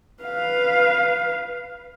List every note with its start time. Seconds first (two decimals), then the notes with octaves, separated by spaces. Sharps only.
0.23 B4 F5